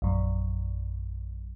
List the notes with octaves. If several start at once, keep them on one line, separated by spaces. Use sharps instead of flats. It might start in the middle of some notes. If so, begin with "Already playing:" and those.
A#1 F#2